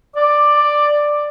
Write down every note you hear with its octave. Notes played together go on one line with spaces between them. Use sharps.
D5